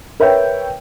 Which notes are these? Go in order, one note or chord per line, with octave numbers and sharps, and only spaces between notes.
A#4 B4 C#5 E5 G5